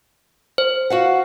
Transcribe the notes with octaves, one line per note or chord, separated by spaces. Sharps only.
C5
F#4 F5 F#5